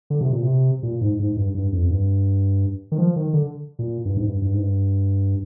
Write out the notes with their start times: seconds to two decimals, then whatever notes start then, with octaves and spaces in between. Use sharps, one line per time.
0.10 D3
0.21 C3
0.32 A#2
0.43 C3
0.83 A#2
1.01 G#2
1.19 G#2
1.37 G2
1.54 G2
1.73 F2
1.90 G2
2.92 D#3
2.98 F3
3.16 D#3
3.33 D3
3.79 A#2
4.05 G2
4.17 G#2
4.24 G2
4.42 G2
4.54 G#2
4.60 G2